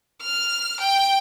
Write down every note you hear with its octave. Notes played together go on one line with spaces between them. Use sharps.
F6
G5